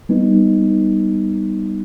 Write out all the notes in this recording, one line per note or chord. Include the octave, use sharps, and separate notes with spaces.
G3 B3 D#4